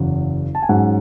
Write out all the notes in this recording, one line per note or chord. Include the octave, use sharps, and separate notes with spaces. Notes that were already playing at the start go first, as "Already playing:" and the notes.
Already playing: F#1 E2 C#3 F#3
A5
G#5
G#2 F#3 C#4 F#5